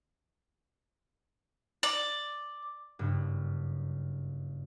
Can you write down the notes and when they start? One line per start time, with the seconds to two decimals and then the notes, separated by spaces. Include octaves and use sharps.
1.83 D5
2.99 F#1 G2